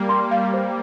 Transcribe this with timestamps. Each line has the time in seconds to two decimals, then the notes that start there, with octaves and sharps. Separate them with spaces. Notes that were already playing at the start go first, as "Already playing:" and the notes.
Already playing: G3 A#3
0.09 C6
0.31 G3 A#3 F5
0.54 C5